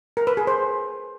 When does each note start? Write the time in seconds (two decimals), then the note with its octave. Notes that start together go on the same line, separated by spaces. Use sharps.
0.17 A#4
0.27 B4
0.37 G#4
0.47 C5